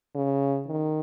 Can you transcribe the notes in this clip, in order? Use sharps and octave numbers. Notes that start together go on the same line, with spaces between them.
C#3
D#3